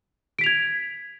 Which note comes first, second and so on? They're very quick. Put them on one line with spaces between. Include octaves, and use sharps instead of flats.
D7 B6 F7 G#6